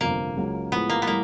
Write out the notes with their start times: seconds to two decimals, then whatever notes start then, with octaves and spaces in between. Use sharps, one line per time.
0.01 G1 F2 C3 A#3
0.37 C#2 C#3 F#3
0.72 A2 F3 G#3 B3
0.89 A#3
1.02 B3
1.07 A2 E3 G3 A#3